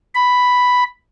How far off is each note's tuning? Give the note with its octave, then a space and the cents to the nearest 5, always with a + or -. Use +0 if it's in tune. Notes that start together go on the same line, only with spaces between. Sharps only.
B5 +5